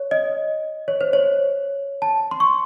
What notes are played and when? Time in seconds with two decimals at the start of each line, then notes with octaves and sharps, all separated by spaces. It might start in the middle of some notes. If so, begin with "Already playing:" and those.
Already playing: C#5
0.11 D#5
0.88 C#5
1.01 C5
1.13 C#5
2.02 A5
2.31 C6
2.40 C#6